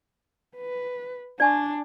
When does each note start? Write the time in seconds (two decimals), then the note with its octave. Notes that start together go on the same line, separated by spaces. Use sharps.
0.56 B4
1.40 D4 D5 G#5 C#6